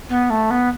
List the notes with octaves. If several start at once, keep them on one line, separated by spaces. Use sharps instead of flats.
B3
A3
B3